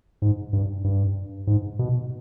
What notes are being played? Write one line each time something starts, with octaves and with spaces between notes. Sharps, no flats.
G#2
G2
G2
G#2
B2